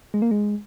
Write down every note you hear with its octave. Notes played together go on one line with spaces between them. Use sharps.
G#3
A#3
G#3